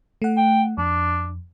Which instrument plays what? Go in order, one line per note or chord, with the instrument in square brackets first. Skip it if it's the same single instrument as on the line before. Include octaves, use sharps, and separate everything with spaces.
[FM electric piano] A3 F#5
[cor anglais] G5
[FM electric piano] F2 [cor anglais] D4